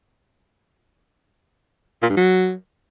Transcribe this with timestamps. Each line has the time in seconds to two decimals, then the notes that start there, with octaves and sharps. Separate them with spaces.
2.02 A#2
2.10 G2
2.17 F#3